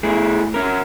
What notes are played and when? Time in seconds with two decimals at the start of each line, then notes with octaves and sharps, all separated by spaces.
0.03 A3 E4 G#4
0.54 C#4 A#4